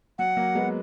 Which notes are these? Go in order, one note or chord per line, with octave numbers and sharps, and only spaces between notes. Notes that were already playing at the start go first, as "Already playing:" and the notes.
F#3 F#5
F#3 A#3
G#3 B3